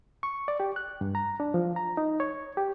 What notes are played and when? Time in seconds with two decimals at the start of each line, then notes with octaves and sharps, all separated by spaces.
0.23 C#6
0.48 D5
0.60 G4
0.76 F#6
1.01 G2
1.15 A#5
1.40 D4
1.54 F3
1.76 A#5
1.97 D#4
2.20 C#5
2.57 G4